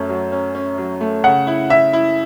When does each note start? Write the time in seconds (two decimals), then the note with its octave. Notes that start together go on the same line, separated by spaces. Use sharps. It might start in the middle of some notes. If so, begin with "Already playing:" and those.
Already playing: F#2 A3 C#4
0.09 F#3
0.32 C#4
0.55 C#4
0.78 F#3
1.01 A3
1.24 C#3 F#5
1.47 E4
1.70 E4 E5
1.93 E4